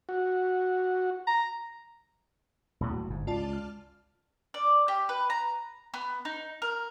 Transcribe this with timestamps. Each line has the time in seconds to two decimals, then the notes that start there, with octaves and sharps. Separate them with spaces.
0.09 F#4
1.27 A#5
2.80 D#1 A2 F#3
3.08 G1 G#2
3.27 C#2 F4 D5 A5
3.53 F6
4.54 D5
4.88 G4
5.09 B4
5.30 A#5
5.94 B3
6.25 D#4
6.62 A#4